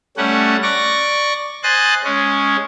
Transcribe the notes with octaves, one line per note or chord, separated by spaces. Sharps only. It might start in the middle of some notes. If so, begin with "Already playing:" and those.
G3 A3 C#4 F#5
D5 C#6 A#6
C5 D#5 G#5 F#6 A6
G#3 C#4